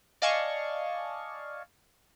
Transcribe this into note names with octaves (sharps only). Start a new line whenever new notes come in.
D5 D#5 F5 G#5 A5 C#6